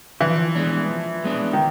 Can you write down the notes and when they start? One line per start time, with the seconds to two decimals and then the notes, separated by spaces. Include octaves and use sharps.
0.20 E3 F3
0.55 G#3 B3 D4
0.90 F3
1.24 G#3 B3 D4
1.53 D#3